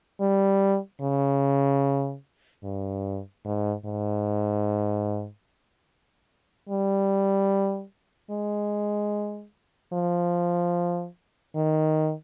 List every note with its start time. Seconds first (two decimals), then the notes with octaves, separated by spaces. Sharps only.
0.20 G3
1.02 C#3
2.63 G2
3.45 G#2
3.85 G#2
6.69 G3
8.31 G#3
9.93 F3
11.55 D#3